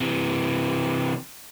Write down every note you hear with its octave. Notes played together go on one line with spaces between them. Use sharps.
C3 E3